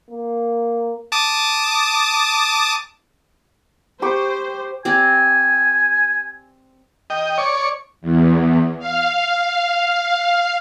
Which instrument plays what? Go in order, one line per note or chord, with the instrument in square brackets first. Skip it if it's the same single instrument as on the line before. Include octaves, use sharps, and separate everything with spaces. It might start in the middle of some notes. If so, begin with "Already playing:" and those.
[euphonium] A#3
[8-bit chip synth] A5 D6 D#6
[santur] G4 C#6 [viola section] C5
[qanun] C4 G4 D5 [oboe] G#5
[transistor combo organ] D#5 G5
C#5 D5 C#6
[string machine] E2
F5